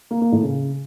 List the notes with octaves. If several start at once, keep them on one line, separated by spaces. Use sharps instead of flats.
A#3
A#3
A2
C#3